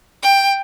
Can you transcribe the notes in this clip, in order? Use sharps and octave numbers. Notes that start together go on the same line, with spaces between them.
G5